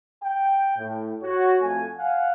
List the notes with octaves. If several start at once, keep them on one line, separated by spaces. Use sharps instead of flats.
G5
A2
F#4 C#5
F2 A3 G#5
F5 F#5 G#5